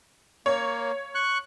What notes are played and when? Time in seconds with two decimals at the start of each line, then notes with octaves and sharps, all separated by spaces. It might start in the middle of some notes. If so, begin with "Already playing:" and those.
0.46 A#3 C#5
1.15 C#6 F#6